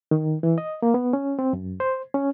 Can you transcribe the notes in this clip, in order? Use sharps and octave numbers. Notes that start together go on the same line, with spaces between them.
D#3
E3
D#5
A#3
B3
C#4
C4
F#2
C5
C#4